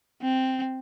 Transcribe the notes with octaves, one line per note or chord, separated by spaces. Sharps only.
C4